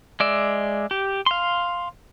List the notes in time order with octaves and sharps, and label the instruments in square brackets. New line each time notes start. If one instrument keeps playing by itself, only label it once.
[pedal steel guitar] G#3 D5 E5
G4
F5 C6